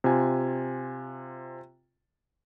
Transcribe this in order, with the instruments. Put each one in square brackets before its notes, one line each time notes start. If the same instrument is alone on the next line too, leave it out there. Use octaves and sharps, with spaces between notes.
[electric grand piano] C3 F4 G#5